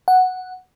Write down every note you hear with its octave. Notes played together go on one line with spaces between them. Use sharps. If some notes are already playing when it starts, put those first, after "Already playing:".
F#5